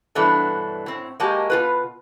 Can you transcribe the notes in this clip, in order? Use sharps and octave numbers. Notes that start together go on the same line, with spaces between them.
G2 B2 E3 F#3 A3 D4
A2 C4
G#3 A#3 F#4 G4 D#5 A5
B2 F4 B4